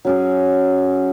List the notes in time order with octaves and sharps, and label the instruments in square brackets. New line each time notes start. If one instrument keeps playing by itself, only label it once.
[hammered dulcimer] F#3 C#4 G#4